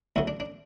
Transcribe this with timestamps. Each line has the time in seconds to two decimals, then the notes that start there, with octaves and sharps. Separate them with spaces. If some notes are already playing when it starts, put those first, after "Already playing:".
0.16 D2 C#3 F#3 A3 E4
0.27 D4
0.40 D4